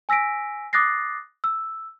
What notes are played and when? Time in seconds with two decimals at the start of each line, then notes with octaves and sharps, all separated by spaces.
0.09 G#5 E6 A#6 B6 D7
0.73 D6 D#6 F#6 A6 A#6 C7
1.44 E6